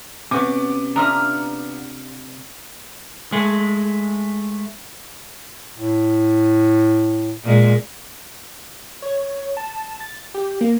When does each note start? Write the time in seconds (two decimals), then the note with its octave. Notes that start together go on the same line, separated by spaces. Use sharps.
0.31 C3 B3 C#4 F#4 D6
0.96 D4 F4 E5 A#5 D#6 F6
3.32 G#3 A3
5.78 A2
7.43 A#2 G#3
9.02 C#5
9.57 A5
10.00 A6
10.34 G4
10.61 A#3